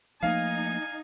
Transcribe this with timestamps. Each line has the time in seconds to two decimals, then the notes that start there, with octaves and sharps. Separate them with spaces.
0.23 F3 A3 A#3 D#4 F5 G#5